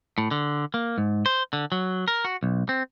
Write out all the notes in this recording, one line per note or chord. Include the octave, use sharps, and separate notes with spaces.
A2
D3
A#3
G#2
C5
D3
F#3
A#4
F#4
B1
C4